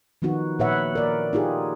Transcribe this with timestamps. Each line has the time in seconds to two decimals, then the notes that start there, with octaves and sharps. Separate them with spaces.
0.22 D#3 F3 B3 D#4 F#4
0.59 A#2 B4 C#5 E5 F#5
0.95 A#4 D5
1.33 D#4 F4 G4 G#4